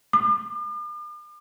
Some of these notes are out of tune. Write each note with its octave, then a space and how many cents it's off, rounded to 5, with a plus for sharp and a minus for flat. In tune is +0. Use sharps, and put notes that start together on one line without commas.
D6 +45